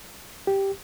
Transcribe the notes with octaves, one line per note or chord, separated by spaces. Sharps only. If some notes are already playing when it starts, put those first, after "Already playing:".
G4